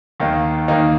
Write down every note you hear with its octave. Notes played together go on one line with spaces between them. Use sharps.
D#2 D#3 A#3 D#4
D#2 D#3 A#3 D#4